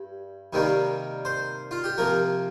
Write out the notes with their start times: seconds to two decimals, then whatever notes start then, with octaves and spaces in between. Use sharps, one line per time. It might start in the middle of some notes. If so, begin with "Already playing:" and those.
Already playing: G2
0.53 C3 D#3 G3 A#3
1.25 C5
1.71 F4
1.84 G4
1.98 C3 F3 A#3 A#4